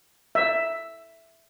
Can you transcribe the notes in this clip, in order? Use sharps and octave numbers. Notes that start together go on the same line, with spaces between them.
E5